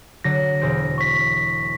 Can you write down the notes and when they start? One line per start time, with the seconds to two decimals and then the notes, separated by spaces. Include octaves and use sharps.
0.24 D3 F#3 A#6
0.60 E1 C5 D7
0.98 C#6 B6